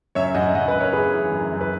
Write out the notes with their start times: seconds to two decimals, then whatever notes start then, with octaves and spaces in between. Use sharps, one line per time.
0.15 F#2 C#5 E5
0.34 F#2 D#5 F#5
0.46 E5
0.55 F#2 D#5 F#5
0.67 B4 D#5
0.74 F#2
0.80 A#4 C#5
0.93 E3 G#4 B4
1.14 E3
1.32 F#2
1.53 F#2
1.61 B4